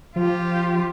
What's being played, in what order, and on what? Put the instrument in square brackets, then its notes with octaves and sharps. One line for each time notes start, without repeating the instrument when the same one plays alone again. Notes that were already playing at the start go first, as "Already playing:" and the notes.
[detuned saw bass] F3 [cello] F4 G4